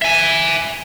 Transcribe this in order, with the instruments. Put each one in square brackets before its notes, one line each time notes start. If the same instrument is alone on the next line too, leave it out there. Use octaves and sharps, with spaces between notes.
[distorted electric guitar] E5 G#5